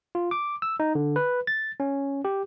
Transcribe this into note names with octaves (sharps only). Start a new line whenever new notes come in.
F4
D6
E6
D#4
D3
B4
A6
C#4
G4